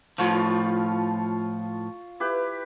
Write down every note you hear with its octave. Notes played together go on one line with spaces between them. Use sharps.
A2 F3 F4 C#5
E4 G4 B4